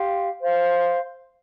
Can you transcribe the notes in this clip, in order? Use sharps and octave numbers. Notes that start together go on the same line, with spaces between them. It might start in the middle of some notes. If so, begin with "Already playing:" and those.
Already playing: G4 F5 C6
C5 F5 C6